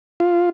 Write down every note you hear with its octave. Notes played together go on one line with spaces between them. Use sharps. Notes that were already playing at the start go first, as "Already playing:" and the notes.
F4